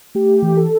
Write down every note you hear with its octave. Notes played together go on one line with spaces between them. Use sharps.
A3 G4
E3
A4